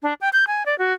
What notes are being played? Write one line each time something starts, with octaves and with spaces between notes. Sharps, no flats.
D4
G5
G6
G#5
D5
F#4